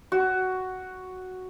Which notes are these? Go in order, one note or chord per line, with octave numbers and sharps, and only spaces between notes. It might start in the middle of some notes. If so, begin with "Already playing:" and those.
F#4